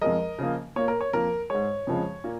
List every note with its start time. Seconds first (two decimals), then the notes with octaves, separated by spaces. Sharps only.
0.01 F2 F3 G#3 A#4 D#5
0.39 C#3 F3 A#3
0.76 A#2 A#3 C#5
0.88 A#4
1.01 C#5
1.13 F2 F3 A#3 A#4
1.50 G#2 G#3 C#5
1.87 F2 C#3 F3 G#3
2.24 A#2 A#3